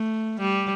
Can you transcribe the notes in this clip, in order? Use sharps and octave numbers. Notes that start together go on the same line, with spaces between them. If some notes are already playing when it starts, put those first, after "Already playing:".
Already playing: A3
G3